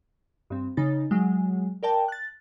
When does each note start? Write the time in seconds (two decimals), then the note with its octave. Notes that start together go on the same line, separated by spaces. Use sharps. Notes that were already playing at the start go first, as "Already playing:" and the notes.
0.50 G2 C4
0.77 C#3 D#4 A6
1.11 F#3 G#3
1.83 A#4 D5 G5 A5
2.08 F#6 A6